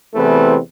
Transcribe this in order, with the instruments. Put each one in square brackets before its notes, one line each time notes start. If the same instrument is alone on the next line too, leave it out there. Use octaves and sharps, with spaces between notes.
[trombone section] E2 C3 E3 A3 C4 B4